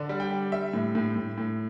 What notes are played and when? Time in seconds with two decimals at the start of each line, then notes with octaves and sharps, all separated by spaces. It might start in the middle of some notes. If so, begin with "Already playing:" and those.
Already playing: D3 D5
0.09 G3
0.20 G5
0.31 G3
0.52 G3 E5
0.73 A2
0.95 A2
1.16 A2
1.38 A2